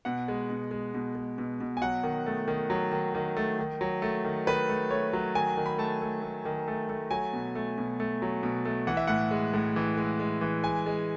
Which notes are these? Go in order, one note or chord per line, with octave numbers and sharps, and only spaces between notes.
B2 F#5
G#3
B2
G#3
B2
G#3
B2
B2
G#5
F#3 F#5
D#3
A3
D#3
F#3
D#3
D#3
A3
D#3
F#3
A3
D#3
D#3 B4
A3
A3 C#5
F#3
D#3 G#5
D#3
B5
A3 A5
A3
A3
D#3
A3
A3
F#3 G#5
B2
A3
B2
A3
F#3
B2
A3
E3 F#5
E5
A2 F#5
G#3
A2
E3
G#3
G#3
E3
G#3 G#5
G#3